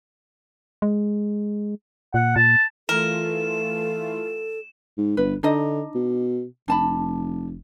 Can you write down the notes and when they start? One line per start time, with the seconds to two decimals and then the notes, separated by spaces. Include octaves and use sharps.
0.82 G#3
2.14 A#2 F#5
2.36 A#2 A5
2.89 E3 A3 F4 A4 A#4 E7
4.97 G#2
5.17 G1 B4
5.43 D3 D4 D#4 D#5
5.95 B2
6.68 F1 D4 A5 B5